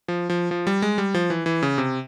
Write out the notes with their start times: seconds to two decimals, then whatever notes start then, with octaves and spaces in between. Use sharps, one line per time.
0.08 F3
0.30 F3
0.51 F3
0.67 G3
0.82 G#3
0.98 G3
1.14 F3
1.30 E3
1.46 E3
1.63 C#3
1.78 C3